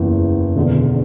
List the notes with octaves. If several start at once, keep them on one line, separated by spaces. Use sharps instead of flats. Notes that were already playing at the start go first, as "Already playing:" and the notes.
Already playing: F#1 E2 E3
E1 E2 D3